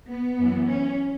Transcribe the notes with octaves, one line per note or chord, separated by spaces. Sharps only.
B3
F#2 E3
C#4